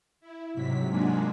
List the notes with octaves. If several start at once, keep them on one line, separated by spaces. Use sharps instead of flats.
E4
G#2 C3 F#3 B6
G#3 A#3 D4 F4 F#4 G#4